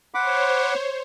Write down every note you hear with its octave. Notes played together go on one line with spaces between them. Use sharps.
C5 C#5 F#5 B5 D6